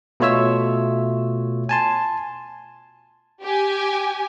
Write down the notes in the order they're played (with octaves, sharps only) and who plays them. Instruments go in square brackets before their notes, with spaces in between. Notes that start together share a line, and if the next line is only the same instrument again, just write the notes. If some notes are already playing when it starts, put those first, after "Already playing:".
[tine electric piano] B2 A3 F4 C#5 E5 E6
G#5 A5 C6
[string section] G4 G#5